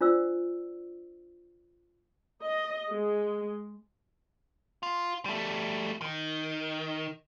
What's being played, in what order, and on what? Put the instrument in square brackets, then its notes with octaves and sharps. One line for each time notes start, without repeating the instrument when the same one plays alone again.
[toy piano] D4 F4 C5 D5 E6
[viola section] D#5
G#3
[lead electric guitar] F4
G3 A3
D#3